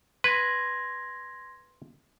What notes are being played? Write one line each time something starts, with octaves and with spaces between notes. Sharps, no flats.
B4 C6 G#6 A#6